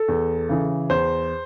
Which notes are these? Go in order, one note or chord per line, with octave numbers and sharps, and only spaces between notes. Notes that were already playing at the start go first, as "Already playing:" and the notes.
Already playing: A4
E2
C#3 E3
E2 C5